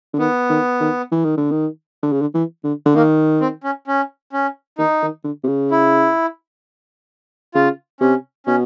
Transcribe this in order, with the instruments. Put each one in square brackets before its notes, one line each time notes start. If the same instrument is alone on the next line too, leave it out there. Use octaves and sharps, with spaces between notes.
[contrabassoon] D3
[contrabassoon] D#3 [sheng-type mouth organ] B3
[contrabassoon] D#3
D#3
E3
D#3
D3
D#3
D3
C#3
D3
E3
D3
D3
[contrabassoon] D#3 [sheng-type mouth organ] A#3
[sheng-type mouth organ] C4
C#4
C#4
C#4
[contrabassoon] D#3 [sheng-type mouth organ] D#4
[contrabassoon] D#3
D3
C3
C#3
[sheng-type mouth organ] E4
[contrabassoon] C#3 [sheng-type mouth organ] F4
[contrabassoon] C3 [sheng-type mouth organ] C#4
[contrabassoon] B2 [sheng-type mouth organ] C#4